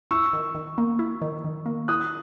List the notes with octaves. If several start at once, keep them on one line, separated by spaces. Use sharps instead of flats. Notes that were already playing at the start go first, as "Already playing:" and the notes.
E4 C#6 E6
D#3
D#3
A#3
E4
D#3
D#3
A#3
E4 D#6 F#6